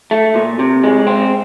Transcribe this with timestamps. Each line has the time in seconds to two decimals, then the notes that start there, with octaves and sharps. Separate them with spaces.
0.11 A3
0.35 A#2
0.59 C3
0.83 G#3
1.07 C4